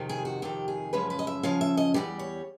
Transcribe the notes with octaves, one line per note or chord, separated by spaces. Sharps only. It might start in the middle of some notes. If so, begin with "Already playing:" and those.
Already playing: F2 C3 D#3
G#4
F#4
F2 C3 D#3 G4
G#4
F#2 C#3 F3 G#3 C#4 B4
B4
D#5
E5
F#2 C#3 F3 C#4 F5
E5
D#5
E2 B2 G3 D5
C#5